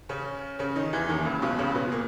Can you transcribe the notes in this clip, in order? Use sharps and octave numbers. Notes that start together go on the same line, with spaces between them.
C#3 C#4
C#3 C#4
D#3 D#4
E2 E3
D#2 D#3
C#2 C#3
B1 B2
C#2 C#3
B2 B3
A#2 A#3